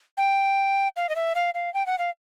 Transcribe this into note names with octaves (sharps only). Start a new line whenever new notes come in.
G5
F5
D#5
E5
F5
F5
G5
F#5
F5